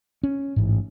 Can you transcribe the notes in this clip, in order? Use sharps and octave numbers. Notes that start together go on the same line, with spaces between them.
C#4
A1 G#2